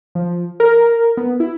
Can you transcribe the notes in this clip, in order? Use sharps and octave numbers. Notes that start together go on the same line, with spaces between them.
F3
A#4
B3
E4